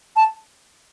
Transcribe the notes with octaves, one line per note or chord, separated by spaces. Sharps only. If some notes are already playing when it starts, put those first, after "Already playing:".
A5